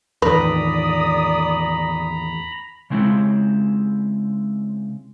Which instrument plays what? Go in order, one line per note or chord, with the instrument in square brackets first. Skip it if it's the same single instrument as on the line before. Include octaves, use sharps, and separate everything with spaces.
[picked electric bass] E2 A2 D#3 [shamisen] B4 [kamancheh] D5 D#6 [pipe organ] A#5 B5
[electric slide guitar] C#3 G#3 C4 E4